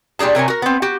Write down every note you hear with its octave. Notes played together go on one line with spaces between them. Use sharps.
A#2 G3 D4 G#4 A5
C3 A#4 C#5 G#5
F#4 A#4
B3 C4
F#4 G4